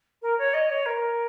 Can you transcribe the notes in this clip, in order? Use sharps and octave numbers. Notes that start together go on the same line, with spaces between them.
A#4
C#5
D#5
C#5
A#4